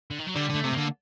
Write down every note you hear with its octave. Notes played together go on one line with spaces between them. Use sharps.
D3
D#3
F#3
D3 G3
D3
A3
C3
D3 A#3